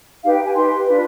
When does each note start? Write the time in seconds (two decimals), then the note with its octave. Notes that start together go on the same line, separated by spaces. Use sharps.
0.24 D#4 G4 B4 F5
0.34 G5
0.44 G#5
0.55 D#4 G4 B4 C6
0.86 D4 F4 B4